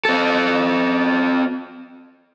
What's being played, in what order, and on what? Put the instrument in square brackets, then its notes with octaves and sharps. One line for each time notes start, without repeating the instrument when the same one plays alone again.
[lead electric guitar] C4 A4